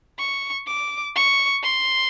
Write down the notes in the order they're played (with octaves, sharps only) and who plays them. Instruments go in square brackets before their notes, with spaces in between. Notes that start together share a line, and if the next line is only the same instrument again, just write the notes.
[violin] C#6
D6
C#6
C6